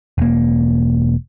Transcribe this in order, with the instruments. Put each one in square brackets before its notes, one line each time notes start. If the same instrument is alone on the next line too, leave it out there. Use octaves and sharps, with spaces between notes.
[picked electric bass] E1 A#3